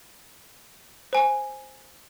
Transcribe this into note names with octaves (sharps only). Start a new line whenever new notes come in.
C5 G#5